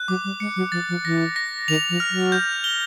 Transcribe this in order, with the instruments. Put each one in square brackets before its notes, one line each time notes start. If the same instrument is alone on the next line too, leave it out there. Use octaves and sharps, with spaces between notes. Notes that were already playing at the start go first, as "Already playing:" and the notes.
Already playing: [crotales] F#6
[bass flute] F#3 [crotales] D6
[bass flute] G3
[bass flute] G#3 [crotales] C#7
[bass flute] F#3
[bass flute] F3 [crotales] A6
[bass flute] F3
[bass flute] E3 [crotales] A#6
[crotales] A#6
[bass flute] D#3 [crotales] F7
[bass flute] F3
[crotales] F6
[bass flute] F#3
[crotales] G6
G7